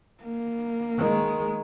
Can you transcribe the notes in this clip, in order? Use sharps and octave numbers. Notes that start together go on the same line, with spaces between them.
A#3
D#3 G#3